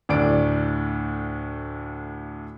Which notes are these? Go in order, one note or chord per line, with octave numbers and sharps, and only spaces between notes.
D2 A2 D4 D5 D7